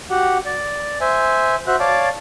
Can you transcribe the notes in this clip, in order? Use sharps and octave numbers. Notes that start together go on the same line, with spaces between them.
F#4 G4 F#5
D5
C5 E5 G#5
F#4 C5 E5 F#6
C#5 D5 F5 A5 D6